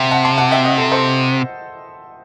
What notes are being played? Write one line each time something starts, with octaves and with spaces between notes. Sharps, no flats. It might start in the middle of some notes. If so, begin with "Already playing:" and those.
Already playing: C3 E5 F#5 G5
F#5 A5
A5 C6
F#5 A5
E5 G5
D#5 F#5
A4
A4 C5